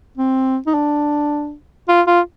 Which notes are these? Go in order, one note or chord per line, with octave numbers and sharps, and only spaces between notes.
C4
D#4
D4
F4
F4